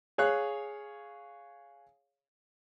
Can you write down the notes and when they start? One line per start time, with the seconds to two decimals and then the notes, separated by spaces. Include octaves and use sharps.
0.18 G#4 C#5 F5 F#6